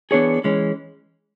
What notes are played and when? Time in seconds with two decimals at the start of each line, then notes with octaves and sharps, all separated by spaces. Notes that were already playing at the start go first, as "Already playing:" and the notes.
0.11 E3 B3 D4 G#4 C#5
0.44 E3 G#3 C#4